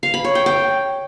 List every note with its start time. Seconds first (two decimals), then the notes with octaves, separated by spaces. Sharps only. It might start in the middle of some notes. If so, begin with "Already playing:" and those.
0.03 F5
0.14 B5
0.24 C#5
0.35 G5
0.46 G5